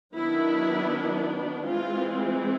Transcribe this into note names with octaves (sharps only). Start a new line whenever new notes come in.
D#3 F#3 B3 D4 E4
E3 G#3 C4 F4